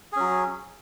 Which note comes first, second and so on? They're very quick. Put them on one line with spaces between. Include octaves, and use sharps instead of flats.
G#4 C#4 F#3